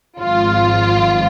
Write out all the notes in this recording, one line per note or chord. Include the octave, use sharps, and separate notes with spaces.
G#1 G#2 F3 F4